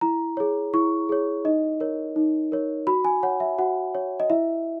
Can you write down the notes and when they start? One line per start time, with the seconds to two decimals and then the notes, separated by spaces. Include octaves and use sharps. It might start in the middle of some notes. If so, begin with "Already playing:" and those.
0.01 E4 A#5
0.37 G#4 C#5
0.74 E4 C#6
1.09 G#4 C#5
1.45 D#4 D#5
1.80 A#4 C#5
2.16 D#4
2.52 A#4 C#5
2.87 F#4 B5
3.05 G#5
3.23 C#5 F#5
3.40 E5
3.58 F#4 F#5
3.95 C#5
4.20 D#5
4.30 E4 E5